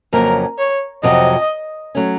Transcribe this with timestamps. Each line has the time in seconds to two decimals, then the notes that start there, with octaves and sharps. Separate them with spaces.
0.13 F2 C#3 F#3 A#3 C#4 A#4
0.59 C#5
1.03 F2 C3 F#3 C4 F#4 D#5
1.95 F#3 A3 C#4